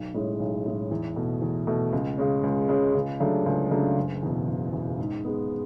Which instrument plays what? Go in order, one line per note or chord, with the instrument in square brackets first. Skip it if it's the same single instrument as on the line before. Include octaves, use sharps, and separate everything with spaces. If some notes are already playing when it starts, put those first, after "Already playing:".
Already playing: [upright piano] B1
A2 G#3 C#4 E4
B1
A2 G#3 C#4 E4
E2
B2 A3
E2
B2 A3
C#2
C#3 G#3 C#4
C#2
C#3 G#3 C#4
C#2
C#3 F#3 A3 D4
C#2
C#3 F#3 A3 D4
F#1
E2 B2
F#1
E2 B2
G#2
G#3 B3